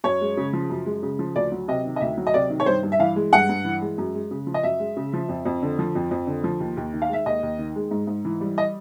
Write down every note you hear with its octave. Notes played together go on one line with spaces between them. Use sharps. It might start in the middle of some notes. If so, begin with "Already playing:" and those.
F#2 C#5
G#3
C#3
F3
F#2
G#3
C#3
F3
D2 D5
F#3
C3 D#5
D#3
D#5
D2 E5
F#3
D#5
C3 D5
D#3
C#5
G2 C5
G2
E5
E3 F5
G#3
G2 F#5
G2
E3
G#3
F#2
G#3
C#3
F3
D#5
F#2 E5
G#3
C#3
F3
F2
F2
D3
F3
F2
F2
D3
F3
D#2
D#2
D#3
F5
G#3 E5
D#2 D#5
D#2
D#3
G#3
G#2
G#2
E3
G3
D#5